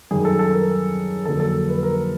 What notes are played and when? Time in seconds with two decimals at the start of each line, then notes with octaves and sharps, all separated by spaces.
0.11 F#2 D#3 G3 G#4
0.25 A4
0.39 A4
0.53 A#4
1.25 F2 D3 F#3 A#3 D4 A4
1.40 A4
1.69 B4
1.83 A#4